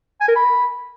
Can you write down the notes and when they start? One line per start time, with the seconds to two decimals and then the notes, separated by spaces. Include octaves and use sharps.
0.21 G#5
0.28 A#4
0.36 B5